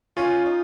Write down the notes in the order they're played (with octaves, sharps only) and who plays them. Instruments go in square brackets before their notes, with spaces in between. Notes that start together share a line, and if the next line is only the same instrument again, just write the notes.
[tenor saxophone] C#4 [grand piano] F4
[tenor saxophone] D#4